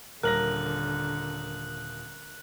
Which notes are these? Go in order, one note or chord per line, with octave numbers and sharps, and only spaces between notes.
D#1 D3 A#4 F#6 A#6 F#7